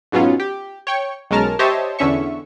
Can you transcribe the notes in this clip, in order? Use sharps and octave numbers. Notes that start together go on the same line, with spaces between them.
G#2 B2 F#3 B3 C#4 F4
G4
C#5 G5 C#6
B1 G#3 C#4 A#4 A5 F6
G4 C5 C#5 D#5 E5 A5
E2 D3 C#4 E5 C#6